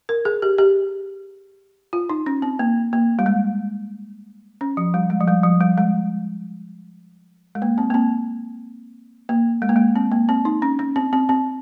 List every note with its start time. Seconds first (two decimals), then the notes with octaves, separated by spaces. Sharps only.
0.09 A#4
0.25 G#4
0.42 G4
0.58 G4
1.93 F4
2.10 D#4
2.26 C#4
2.42 C4
2.59 A#3
2.93 A#3
3.19 G3
3.26 G#3
4.61 C#4
4.77 F3
4.94 G3
5.10 G#3
5.20 F3
5.28 G3
5.43 F3
5.61 G3
5.78 G#3
7.55 G#3
7.62 A#3
7.78 C4
7.90 A#3
7.94 C4
9.29 A#3
9.62 G#3
9.69 A#3
9.76 G#3
9.96 C4
10.12 A#3
10.29 C4
10.45 D#4
10.62 C#4
10.79 C#4
10.96 C4
11.13 C4
11.29 C4